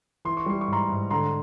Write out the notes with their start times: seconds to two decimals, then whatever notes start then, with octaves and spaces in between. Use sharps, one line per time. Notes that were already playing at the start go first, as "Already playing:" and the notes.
0.25 E3 C6
0.37 C#6
0.46 G3 C6
0.61 C#6
0.68 G#2 A#5 C6
0.89 G#2
1.10 D3 A#5 C6